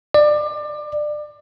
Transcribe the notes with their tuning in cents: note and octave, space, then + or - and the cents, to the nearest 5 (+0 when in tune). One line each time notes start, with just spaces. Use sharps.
D5 +25